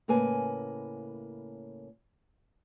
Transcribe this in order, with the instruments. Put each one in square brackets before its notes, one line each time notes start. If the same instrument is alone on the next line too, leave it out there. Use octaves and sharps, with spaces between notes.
[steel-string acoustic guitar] A2 C#3 A#3 B4 G#5